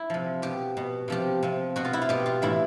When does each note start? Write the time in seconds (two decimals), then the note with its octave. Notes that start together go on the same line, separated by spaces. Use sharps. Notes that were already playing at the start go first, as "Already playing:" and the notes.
Already playing: E4
0.10 C3 F3
0.42 B2 G4
0.77 B2
1.08 C3 F3 G4
1.43 C3 F3
1.76 B2 F#4
1.85 F4
1.93 E4
2.02 F4
2.09 B2 G4
2.26 F4
2.42 A2 E3 E4